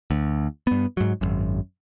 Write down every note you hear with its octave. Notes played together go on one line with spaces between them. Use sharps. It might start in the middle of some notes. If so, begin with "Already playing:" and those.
D2
G2 B3
G#2 F#3
G#1 C#2 F#2